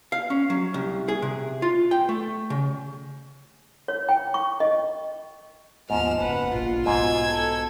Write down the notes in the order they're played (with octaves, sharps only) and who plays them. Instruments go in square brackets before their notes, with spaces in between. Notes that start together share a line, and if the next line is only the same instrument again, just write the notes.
[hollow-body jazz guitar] F5
C#4
F#3
C2
G#4
C3
F4
G5
A3
C#3
[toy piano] C#5
G5
C#6
D#5
[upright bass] D#2 B3 [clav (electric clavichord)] G#2 [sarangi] F3 [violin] F6 E7
[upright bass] F#1 [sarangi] B4 [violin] F#5
[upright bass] A#1 B2 [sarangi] F4
[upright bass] B1 B2 [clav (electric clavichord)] G#2 [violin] E6 G#6
[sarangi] A4